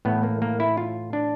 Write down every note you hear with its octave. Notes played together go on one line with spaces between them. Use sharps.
A2 E3 A3 B3
A#3
A#3
E4
F4
D4